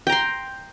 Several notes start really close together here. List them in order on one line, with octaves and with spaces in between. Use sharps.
G5 A#5 C6